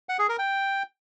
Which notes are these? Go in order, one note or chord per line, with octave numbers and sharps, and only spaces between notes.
F#5
G#4
A#4
G5